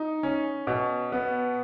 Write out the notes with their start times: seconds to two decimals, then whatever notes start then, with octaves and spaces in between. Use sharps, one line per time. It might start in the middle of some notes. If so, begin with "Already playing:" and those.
Already playing: D#4
0.23 C#4
0.67 B2
1.12 B3